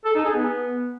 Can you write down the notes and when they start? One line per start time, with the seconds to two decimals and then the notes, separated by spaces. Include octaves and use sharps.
0.05 A4
0.15 D#4
0.25 G#4
0.35 B3